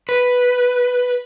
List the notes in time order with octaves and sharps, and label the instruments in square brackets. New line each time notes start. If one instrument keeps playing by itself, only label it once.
[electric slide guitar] B4